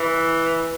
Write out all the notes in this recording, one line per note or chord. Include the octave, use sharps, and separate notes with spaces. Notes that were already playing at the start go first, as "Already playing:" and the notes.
Already playing: E3